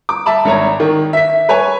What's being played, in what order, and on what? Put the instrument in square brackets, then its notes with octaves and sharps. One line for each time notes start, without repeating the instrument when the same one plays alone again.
[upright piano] D6
E5 A5 B5
G#1 C#5 A#5
D#3
E5 B6
B4 C#5 G#5